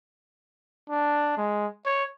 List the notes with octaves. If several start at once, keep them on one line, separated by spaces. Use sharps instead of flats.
D4
G#3
C#5